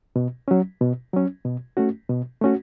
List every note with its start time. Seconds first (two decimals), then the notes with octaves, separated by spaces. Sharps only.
0.16 B2
0.48 F#3 C#4
0.81 B2
1.13 F#3 C#4
1.45 B2
1.77 A3 C#4 F#4
2.10 B2
2.41 A3 C#4 F#4